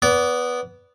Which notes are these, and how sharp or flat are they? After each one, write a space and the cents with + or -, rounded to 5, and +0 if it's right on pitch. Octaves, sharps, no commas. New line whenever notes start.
B3 +0 D5 -30